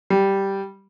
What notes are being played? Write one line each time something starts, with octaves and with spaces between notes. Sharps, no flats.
G3